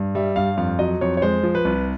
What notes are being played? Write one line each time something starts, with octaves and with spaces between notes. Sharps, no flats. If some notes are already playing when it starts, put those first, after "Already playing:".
Already playing: G2
G3 E5
G2 F5
F2 F5
F#3 D#5
F2 C#5
C#5
G#3 C5
F3
B4
C2